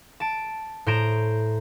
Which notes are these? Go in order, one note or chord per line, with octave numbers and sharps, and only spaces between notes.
A5 D7
A2 C5 A#5 D7 E7